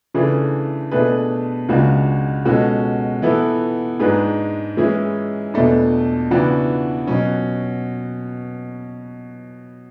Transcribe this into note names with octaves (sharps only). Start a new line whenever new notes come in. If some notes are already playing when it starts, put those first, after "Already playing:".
C#3 E3 A3 D4 G#4
B2 A3 D4 G#4 B4
C#2 C#3 G#3 D4 F#4
B2 G#3 C#4 F#4 A4
E3 B3 E4 A4
G#2 G#3 D4 G#4 B4
E3 G#3 C#4 E4 G#4
E2 B2 A3 D4
C#3 E3 B3 D4 F#4
B2 F#3 C#4